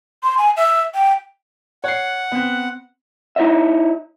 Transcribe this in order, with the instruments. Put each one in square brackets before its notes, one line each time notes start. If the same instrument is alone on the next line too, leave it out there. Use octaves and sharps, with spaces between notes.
[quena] C6
G#5
E5
G5
[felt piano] C#5 C7 [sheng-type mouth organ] F#5
[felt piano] B3 C4
[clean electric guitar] D#4 E4 C#5 D#5 E5